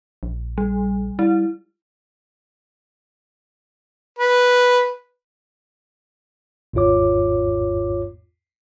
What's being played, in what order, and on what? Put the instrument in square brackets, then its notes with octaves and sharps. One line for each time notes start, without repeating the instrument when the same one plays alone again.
[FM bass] A#1
[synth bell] G3
[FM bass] G3 [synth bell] E4
[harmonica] B4
[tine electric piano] G#1 E2 G#2 F4 C#5 D6